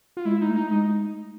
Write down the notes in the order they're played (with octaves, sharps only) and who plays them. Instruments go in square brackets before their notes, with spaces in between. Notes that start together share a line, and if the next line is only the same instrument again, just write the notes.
[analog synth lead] F4
[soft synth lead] G#3 [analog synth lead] E4
[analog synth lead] D#4
[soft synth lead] A3
[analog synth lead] D#4
[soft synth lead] G#3 [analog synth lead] D#4